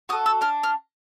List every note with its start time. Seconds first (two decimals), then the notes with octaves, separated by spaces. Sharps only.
0.09 F#4 D#6
0.13 A4
0.26 E6
0.41 D4 F6
0.63 F6